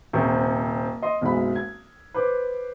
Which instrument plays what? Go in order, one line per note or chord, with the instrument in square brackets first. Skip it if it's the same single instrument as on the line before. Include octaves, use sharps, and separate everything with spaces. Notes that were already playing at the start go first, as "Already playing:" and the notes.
[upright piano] D#1 C3 C5 C#6
D#5 C6
F#1 B1 G#3 F#4 B5
G#6
B4 C5 D6